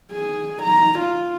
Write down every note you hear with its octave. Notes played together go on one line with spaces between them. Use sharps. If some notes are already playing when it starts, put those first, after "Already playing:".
G#4
A#5
F4